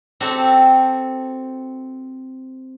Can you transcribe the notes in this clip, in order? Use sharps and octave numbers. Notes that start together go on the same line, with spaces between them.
C4 F#4 G4 A4